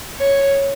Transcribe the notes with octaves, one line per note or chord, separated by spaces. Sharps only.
C#5